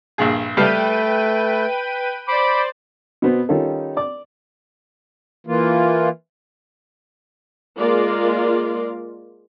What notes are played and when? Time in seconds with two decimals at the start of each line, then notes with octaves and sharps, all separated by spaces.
0.18 A#1 G2 G#4
0.57 G3 A3 G4 B4 F5 G5 D#7
2.28 C5 D5 B5 D6
3.22 B2 B3 C4
3.49 D#3 G3 C#4 D#4 F4 A4
3.97 D5 D6
5.47 E3 A#3 F4
7.78 G#3 A#3 F4 A#4 D5